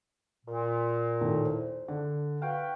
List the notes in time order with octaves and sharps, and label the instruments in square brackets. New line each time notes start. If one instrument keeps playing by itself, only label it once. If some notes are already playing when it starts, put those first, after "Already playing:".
[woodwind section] A#2
[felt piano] D#2 A2 A3
C5
D3
[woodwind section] F#4 B4 G5 [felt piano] F5